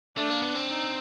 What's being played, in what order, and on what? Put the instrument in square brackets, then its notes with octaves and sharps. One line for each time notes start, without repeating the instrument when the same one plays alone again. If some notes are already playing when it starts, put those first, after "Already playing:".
[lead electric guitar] A3 [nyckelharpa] D4
[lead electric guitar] A#3
B3
C4
[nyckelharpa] D#4